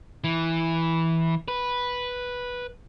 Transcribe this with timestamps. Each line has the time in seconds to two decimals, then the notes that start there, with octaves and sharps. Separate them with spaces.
0.24 E3
1.48 B4